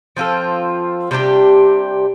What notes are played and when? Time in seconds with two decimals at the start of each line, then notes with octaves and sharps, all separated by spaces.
0.17 F3 C4 F4 A4
1.11 C3 G3 D4 G4